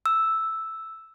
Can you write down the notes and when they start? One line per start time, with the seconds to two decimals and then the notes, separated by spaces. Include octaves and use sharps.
0.06 E6